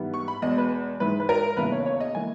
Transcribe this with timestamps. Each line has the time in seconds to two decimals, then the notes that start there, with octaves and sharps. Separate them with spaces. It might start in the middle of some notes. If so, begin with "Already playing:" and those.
Already playing: G#2 E3 G3 B3
0.14 C#6
0.28 B5
0.42 E2 B2 G#3 D#5
0.58 B4
0.99 G#2 E3 G#3 B4
1.20 B4
1.29 A#4
1.57 E1 D#2 C#3 E3 A#3 B4
1.72 C#5
1.86 C#5
2.00 D#5
2.15 E3 A#3 G#5